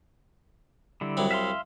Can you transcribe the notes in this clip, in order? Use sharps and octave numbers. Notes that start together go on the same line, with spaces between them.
D3 G3 E4
C2 F#3
E5 F5 C6